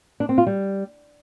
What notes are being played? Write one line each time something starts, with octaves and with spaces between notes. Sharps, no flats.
D4
C4
F4
G3